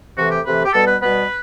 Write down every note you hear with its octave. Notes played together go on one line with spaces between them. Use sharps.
C3 E3 A3 F#4
G4
C3 E3 A3 B4
G4
B2 G3 B3 A4
B4
B2 G3 B3 B4